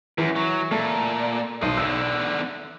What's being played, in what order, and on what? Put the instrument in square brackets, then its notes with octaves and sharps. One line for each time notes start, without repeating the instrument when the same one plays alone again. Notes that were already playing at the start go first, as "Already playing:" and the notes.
[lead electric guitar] F#2 [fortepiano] E3
[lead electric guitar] F#3
[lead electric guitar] A#2 [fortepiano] A3
[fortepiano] B1 [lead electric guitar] C5 D#5
[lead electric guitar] E2 D3 [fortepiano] E6